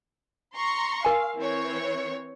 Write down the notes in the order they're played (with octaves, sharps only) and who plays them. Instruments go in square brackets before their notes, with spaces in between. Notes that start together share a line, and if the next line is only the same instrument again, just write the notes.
[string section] A#5 C6 C#6
[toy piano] A#4 G#5 [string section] F5
[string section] E3 C4 C#5